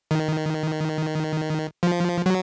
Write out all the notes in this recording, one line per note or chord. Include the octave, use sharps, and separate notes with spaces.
D#3
F3
F#3